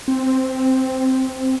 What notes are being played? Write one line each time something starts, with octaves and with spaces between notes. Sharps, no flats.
C4